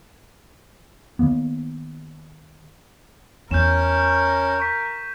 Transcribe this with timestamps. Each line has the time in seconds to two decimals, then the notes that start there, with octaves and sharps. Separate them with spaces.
1.19 D#3 E3 A#3 B3
3.51 E2 C#4 A#4 G6 E7
4.60 C#6 B6